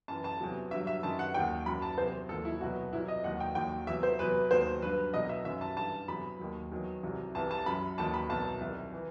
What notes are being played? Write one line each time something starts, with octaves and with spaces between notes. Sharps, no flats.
F#2 E3 A5
A5
E2 C3 F#3
G2 F#3 E5
E5
F#2 D#3 F#3 A5
F#5
D#2 D#3 F#3 G5
F#2 F#3 B5
A5
E2 C3 F#3 C5
D#2 D#3 F#3 A4
E4
C2 B2 F#3 F#4
C2 C3 F#3 E4
D#5
D#2 D#3 F#3 F#5
G5
D#2 D#3 F#3 G5
E2 C3 F#3 E5
C5
E2 C3 F#3 B4
D#2 D#3 F#3 C5
G2 F#3 B4
C2 B2 F#3 D#5
E5
F#2 D#3 F#3 E5
A5
G2 E3 A5
E2 C3 F#3 B5
D#2 D#3 F#3
E2 D#3 F#3
C2 C3 F#3
C2 C3 E3 A5
A5
F#2 F#3 B5
D#2 D#3 F#3 A5
B5
C2 B2 F#3 A5
C2 C3 D#3 F#3
E3